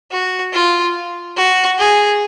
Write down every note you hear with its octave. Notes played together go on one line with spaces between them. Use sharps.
F#4
F4
F#4
G#4